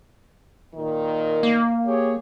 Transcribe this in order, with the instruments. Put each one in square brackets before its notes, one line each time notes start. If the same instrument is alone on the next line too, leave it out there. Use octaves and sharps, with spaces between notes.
[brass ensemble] A#2 D#3
[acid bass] A#3
[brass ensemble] G4 G#4 C#5